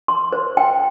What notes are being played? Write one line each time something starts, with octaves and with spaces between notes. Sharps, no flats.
C6
C5
G5